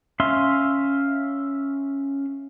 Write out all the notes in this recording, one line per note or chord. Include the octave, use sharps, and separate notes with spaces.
C#4 E5 F5 C6